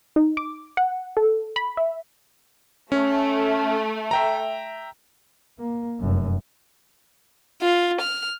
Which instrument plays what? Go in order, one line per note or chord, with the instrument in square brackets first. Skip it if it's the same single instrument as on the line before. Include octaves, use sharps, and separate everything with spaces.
[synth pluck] D#4
D6
F#5
A4
B5
E5
[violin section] A3 [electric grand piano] C#4
[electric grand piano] E5 G5 A#5
[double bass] A#3
F1 F#2
[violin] F4
F6